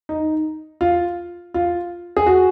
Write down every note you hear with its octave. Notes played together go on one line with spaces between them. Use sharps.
D#4
F4
F4
G#4
F#4